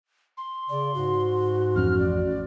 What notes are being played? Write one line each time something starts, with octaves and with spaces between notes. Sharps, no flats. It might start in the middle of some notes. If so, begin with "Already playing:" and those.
C6
C#3 D5
G#2 F#4
A1 F2 C#4 F6
D5